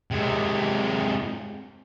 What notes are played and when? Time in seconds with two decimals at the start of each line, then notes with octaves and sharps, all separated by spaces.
0.11 C3 G#3